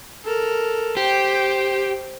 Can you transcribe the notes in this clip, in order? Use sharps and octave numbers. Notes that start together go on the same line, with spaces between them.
A4 A#4
G4 C5 G5